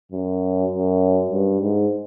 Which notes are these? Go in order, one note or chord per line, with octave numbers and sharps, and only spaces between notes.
F#2
F#2
G2
G#2